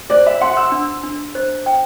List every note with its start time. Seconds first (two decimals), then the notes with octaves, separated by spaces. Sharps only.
0.10 C5 D5
0.26 E5
0.41 F#5 C6
0.57 E6
0.72 D4
1.03 D4
1.35 C5
1.66 G5